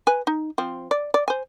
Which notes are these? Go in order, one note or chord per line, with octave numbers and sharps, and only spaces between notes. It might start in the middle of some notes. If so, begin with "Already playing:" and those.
B4 G#5
D#4
F3 C4
D5
D5
C5 G#5